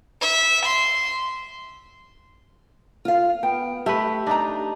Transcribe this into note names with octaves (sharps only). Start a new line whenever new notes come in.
E5
C6
F4 F5
B3 G5
A3 G4 B4 E5
D4 D#4 D#5 A#5